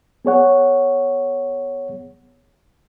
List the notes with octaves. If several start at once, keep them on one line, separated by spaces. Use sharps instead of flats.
B3 G#4 C#5 F#5